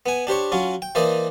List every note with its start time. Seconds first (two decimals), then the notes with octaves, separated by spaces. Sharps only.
0.06 B3 G#5
0.27 D4 G4 C5 C#5
0.52 F#3 C#4 F4
0.82 G5
0.95 E3 A#3 C5 D5 D#5